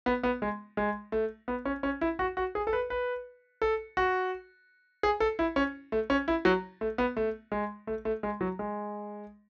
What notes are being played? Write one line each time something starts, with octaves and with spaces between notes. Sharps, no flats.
B3
B3
G#3
G#3
A3
B3
C#4
C#4
E4
F#4
F#4
G#4
A4
B4
B4
A4
F#4
G#4
A4
E4
C#4
A3
C#4
E4
F#3
A3
B3
A3
G#3
A3
A3
G#3
F#3
G#3